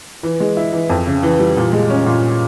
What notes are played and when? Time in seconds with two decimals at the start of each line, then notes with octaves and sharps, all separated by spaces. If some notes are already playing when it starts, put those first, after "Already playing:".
0.23 E3
0.40 G#3
0.57 E4
0.73 E3
0.90 F2
1.07 C#3
1.23 E3
1.40 G3
1.57 A#2
1.73 G#3
1.90 C#4
2.06 A#2